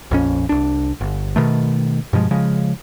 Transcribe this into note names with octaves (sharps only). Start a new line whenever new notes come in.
A#1 F2 C#4
C2 D4
G1
B2 D#3 A3
G2 B2 F3 G#3
C#3 F3 G#3